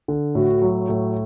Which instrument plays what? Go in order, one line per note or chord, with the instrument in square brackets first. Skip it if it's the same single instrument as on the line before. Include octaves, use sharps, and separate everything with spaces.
[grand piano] D3
[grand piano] A2 [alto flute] F#4
[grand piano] F#3
A2